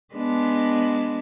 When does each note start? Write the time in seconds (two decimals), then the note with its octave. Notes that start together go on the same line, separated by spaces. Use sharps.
0.14 G#3 B3 D4